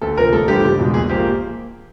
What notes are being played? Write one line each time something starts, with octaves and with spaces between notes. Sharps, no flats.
D2 A4
C3 F3 A#4
A1 A4
G2 D3 F3 G4
F#1
E2 B2 G#3
A#1 G#4
F3 A#3 G4